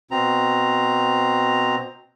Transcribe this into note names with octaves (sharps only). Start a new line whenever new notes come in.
B2 C4 A#5